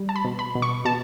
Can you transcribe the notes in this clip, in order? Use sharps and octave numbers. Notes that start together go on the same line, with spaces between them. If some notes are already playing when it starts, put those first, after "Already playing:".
Already playing: G3
A5
B5
B2
B5
B2
C#6
B2 A5